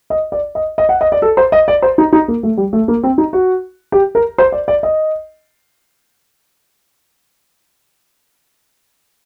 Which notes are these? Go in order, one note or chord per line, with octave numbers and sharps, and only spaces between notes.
D#5
D5
D#5
D#5
F#5
D#5
D5
A4
C5
D#5
D5
C5
D#4
D#4
A#3
A3
G3
A3
A#3
C4
D#4
F#4
G4
A#4
C5
D5
D5
D#5